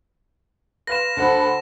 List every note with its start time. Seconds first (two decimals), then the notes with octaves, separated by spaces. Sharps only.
0.87 B4 F5 C6 A#6 E7
1.17 D2 A4 C5 F#5 B5